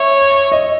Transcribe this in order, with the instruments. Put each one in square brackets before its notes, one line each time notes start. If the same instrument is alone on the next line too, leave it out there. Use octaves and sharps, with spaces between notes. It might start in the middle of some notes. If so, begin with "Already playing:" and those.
Already playing: [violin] C#5 [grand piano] E5
[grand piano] D#5